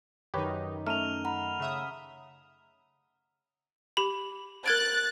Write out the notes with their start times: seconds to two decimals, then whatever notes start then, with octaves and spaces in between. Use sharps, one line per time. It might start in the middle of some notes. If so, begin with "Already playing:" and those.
0.34 F#2 D#3 D#4 G4 B4 C#5
0.87 A3 C#4 A#5 F6 D#7 F7
1.25 F#5 A#5 B5
1.60 C#3 E5 D#6
3.97 G4 B5
4.66 A#4 F#6 G#6 A6 D7